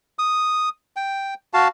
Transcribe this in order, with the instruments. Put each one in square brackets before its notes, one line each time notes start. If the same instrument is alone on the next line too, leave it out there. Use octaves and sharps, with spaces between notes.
[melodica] D#6
G5
F#4 F5 A5